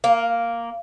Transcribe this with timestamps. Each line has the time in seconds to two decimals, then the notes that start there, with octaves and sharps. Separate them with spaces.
0.04 A#3